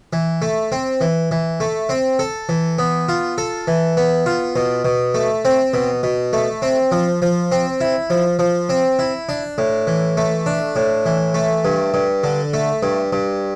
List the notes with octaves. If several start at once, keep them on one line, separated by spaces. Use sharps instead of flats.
E3
A3
C4
E3
E3
A3
C4
A4
E3
B3
F4
A4
E3
B3
F4
B2
B2
A3
C4
B2
B2
A3
C4
F3
F3
C4
E4
F3
F3
C4
E4
D4
A2
E3
A3
D4
A2
E3
A3
G2
G2
D3
A3
G2
G2